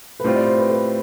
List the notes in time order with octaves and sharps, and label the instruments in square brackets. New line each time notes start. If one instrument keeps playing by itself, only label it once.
[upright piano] B4
[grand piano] A2 G3 C4 F4 [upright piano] C5
[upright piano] D5
C5
B4
B4